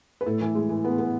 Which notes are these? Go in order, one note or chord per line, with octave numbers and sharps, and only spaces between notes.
B4
A2 A4
E3
G#3
E3
B3
B3